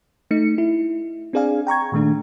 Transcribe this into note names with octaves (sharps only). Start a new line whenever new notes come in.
A3 D#4 C#7
E4
C4 D4 G#4 D5 F5 G#5
G5 A#5 C#6 G#6
A#2 D#3 A3 D4